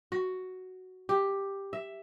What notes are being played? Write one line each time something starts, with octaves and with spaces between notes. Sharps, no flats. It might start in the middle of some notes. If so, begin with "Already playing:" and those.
F#4
G4
E5